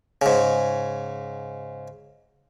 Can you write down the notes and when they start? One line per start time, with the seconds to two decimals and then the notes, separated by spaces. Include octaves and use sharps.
0.22 G#2 C#3